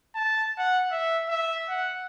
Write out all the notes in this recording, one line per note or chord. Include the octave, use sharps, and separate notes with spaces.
A5
F#5
E5
E5
F#5